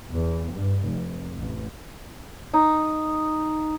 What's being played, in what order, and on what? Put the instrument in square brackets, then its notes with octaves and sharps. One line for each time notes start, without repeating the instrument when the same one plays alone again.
[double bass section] E2
G2
F1
A1
[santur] D#4